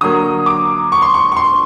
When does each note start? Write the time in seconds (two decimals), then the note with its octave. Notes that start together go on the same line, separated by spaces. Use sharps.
0.01 D3 F#3 A#3 D#6
0.46 D6
0.92 C#6
1.02 C6
1.14 C#6
1.32 C#6
1.37 C6